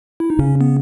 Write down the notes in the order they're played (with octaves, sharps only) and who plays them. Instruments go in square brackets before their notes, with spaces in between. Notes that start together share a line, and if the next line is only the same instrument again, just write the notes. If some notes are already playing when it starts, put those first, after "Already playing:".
[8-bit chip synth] E4
D#4
[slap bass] C#3 [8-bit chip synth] C#4
[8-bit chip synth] B3